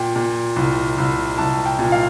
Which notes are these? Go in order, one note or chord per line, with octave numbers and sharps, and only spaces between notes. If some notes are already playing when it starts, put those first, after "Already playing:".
Already playing: A#2 G5
A#2
C2
C2
C2 A5
G5
A#2
F5